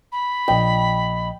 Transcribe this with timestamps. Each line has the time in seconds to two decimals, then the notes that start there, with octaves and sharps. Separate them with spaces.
0.12 B5
0.48 A#1 D#5 G5